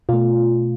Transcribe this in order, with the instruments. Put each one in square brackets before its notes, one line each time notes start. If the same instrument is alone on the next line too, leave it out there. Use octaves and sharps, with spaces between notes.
[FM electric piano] B2 A3 F4